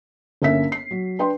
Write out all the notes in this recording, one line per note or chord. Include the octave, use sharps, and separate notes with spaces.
G1 A#3 C#4 E5 B6
C7
F#3
D4 B4 G5 C6